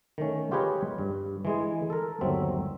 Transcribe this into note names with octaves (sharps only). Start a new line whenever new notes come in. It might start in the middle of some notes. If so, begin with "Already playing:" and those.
D#3 A3 C#4
F4 G4 G#4 B4 C#5 D#5
G2
E3 G#3 G#4
A4 A#4
G1 D#2 F#3 C4 E5